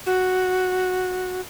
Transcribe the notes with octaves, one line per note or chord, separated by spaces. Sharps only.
F#4